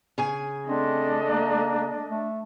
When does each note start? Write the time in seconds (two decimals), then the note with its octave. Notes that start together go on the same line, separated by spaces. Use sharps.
0.18 C#3 G#4 G#5
0.67 A3 C4 D4 D#5
1.25 A#3
2.10 A3